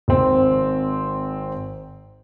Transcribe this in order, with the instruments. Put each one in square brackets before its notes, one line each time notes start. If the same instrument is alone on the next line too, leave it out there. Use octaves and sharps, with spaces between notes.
[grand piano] G#1 C4